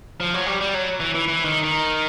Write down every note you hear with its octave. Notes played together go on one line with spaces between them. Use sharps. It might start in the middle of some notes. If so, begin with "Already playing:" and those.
F3
F#3
G3
G3
F#3
E3
E3
E3
D#3
D#3